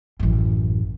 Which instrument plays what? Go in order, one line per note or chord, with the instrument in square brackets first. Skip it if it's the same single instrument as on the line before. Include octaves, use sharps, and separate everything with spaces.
[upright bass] A1 F#2